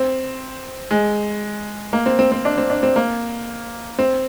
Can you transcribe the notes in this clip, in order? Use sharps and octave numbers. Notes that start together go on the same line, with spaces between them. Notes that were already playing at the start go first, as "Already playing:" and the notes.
Already playing: C4
G#3
A#3
C4
C4
C4
D4
C4
D4
C4
A#3
C4